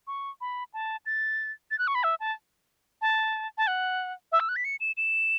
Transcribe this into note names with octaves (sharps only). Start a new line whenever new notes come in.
C#6
B5
A5
A6
A6
F#6
C#6
B5
E5
A5
A5
A5
F#5
E5
E6
F#6
B6
C#7
E7
E7